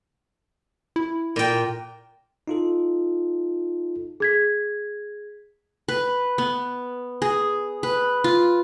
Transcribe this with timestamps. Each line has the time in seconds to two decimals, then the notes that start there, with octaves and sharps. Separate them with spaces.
0.96 E4
1.36 A#2 G5
2.48 D#4 F4 A4
4.20 G#4 G#6 B6
5.88 B4
6.38 B3
7.22 G#4
7.83 B4
8.24 F4